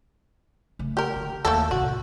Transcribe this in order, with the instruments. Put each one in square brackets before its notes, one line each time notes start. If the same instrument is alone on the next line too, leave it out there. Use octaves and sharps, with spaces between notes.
[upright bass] C#3 A3
[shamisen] G4 A#4
[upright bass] D3
[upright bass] D#2 [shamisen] A3 A#3 A4
[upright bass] C2 A2 [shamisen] F#4